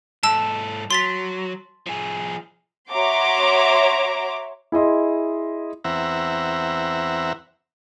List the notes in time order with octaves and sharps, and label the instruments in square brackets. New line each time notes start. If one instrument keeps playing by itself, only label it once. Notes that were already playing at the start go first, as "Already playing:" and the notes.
[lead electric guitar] G#2 A4 [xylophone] A5 E6
[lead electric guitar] F#3 [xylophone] C6 A6 B6
[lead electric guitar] F3 G#4
[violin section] F#4 C#5 E5 A#5 C6 D6
[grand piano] E4 G#4 D#5 C6
[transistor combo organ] E2 C4 E5 F#5 A#5